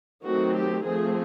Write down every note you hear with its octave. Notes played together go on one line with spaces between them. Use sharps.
D#3 F#3 A3 C4 F#4
G4
F3 A3 C4 G#4